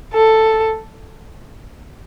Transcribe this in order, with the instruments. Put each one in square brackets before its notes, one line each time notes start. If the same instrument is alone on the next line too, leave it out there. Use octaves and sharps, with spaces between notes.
[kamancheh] A4